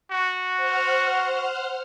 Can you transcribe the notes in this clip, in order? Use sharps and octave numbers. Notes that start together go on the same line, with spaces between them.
F#4
C5 F#5 F6